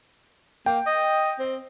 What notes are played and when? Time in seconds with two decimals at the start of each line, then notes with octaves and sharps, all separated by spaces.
0.66 A#3 G5
0.86 D#5
1.39 C4